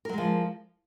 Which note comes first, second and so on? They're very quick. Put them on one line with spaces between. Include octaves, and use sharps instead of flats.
A#4 F#3 G#3 F3